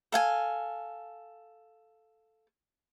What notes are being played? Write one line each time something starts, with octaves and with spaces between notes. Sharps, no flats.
A4 F5 G#5